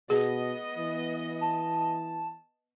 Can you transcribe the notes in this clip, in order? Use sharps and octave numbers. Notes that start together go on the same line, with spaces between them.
B2 B3 G#4 D#5
E3
A5